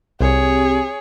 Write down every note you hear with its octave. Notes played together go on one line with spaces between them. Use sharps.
C2 C4 G4 G#4 C#5